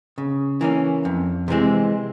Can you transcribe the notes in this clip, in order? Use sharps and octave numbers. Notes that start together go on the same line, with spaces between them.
C#3
E3 A#3 C#4
F2
C3 E3 G#3 C4